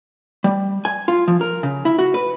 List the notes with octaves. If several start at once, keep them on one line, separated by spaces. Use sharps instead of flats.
G3
G#5
F4
F3
A#4
C#3
E4
F#4
B4